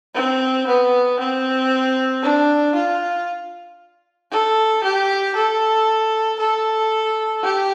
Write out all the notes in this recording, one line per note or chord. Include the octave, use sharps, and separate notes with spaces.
C4
B3
C4
D4
F4
A4
G4
A4
A4
G4